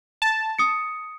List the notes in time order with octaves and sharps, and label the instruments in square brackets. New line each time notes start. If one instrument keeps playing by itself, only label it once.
[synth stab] A5
[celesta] D#6 C#7